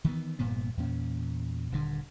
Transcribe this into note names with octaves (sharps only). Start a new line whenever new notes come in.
D#3 E3 G#3 B3
F1 G2 A#2 B3
E2 A#2 C#4
D#1 G2 D3